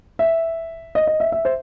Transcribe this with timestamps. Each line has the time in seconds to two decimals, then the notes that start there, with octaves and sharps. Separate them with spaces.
0.19 E5
0.95 D#5
1.07 D#5
1.20 E5
1.32 E5
1.45 C5